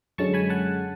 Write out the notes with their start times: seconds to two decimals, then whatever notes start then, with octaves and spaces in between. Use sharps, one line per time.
0.18 F#2 D3 G#3 C#4 A5 C#6
0.34 G#5 B5
0.49 F#5 A5